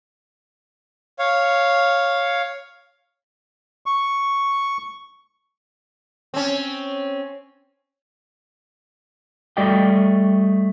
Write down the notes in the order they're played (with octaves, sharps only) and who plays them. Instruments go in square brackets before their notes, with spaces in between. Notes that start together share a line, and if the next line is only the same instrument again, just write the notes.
[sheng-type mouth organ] C#5 F5
[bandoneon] C#6
[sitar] C4 C#4
[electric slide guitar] G3 A3 F#4 D5 D#5 G5